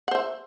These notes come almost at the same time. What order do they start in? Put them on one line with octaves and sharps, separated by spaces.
F#5 C5 E5